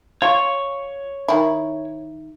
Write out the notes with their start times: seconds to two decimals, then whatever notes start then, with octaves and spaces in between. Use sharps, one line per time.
0.22 F4 C#5 C#6
1.28 D#3 E4